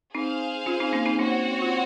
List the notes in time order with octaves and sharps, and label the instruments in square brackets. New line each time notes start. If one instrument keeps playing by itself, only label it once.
[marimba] C4 D#4 [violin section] G#4 C5 F5
[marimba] C#4 F4
C4 D#4
A#3 C#4
C4 D#4
[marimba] A#3 C#4 [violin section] C4 F#4 C#5 F#5
[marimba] F4